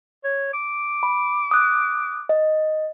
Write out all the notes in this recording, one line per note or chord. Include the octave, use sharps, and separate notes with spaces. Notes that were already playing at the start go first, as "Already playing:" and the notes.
C#5
D6
B5
D#6 F#6
D#5